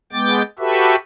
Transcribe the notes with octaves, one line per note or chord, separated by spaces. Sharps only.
G#3 B3 G5 D6 A6
F#4 G4 A4 B4 E5